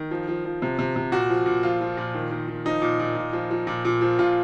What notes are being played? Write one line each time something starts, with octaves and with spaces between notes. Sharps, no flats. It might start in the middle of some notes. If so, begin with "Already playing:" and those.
Already playing: D#3
F3
F3
F3
C3
C3
C3
A#2 F#4
F3
A#2
F3 F4
F3
A#2
D#3
D#3
D#3
F3 D#4
A#2
A#2
A#2
F3
F3
A#2
A#2
F3
A#2 F4